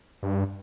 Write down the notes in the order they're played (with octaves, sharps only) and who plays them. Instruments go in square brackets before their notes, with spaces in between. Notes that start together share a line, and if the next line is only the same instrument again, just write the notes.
[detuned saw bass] G2